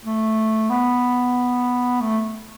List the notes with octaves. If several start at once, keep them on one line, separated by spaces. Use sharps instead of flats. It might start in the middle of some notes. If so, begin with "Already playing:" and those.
A3
B3
A3